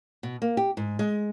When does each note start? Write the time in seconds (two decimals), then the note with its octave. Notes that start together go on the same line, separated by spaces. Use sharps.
0.23 B2
0.42 A#3
0.57 G4
0.77 G#2
0.99 G#3